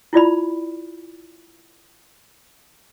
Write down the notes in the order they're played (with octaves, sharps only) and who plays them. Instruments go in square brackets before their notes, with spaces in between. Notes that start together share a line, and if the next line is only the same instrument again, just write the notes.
[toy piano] E4 F4 D5 B5